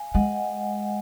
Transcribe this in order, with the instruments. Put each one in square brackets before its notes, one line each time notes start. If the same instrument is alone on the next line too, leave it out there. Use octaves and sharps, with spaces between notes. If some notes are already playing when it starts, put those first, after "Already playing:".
Already playing: [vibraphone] F5 G#5
[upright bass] G#3 [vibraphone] D#5 F#5